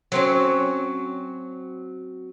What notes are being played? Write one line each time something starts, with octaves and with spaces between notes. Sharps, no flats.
F#3 C4 C#4